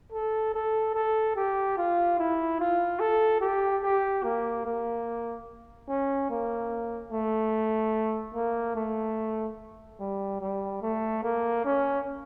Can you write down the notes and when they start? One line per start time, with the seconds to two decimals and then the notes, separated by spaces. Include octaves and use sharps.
0.12 A4
0.54 A4
0.94 A4
1.36 G4
1.77 F4
2.19 E4
2.60 F4
3.00 A4
3.41 G4
3.83 G4
4.23 A#3
4.65 A#3
5.88 C#4
6.30 A#3
7.12 A3
8.34 A#3
8.76 A3
10.00 G3
10.41 G3
10.82 A3
11.23 A#3
11.65 C#4